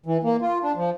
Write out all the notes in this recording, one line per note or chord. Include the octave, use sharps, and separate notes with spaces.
E3
A#3
F4
D4
F3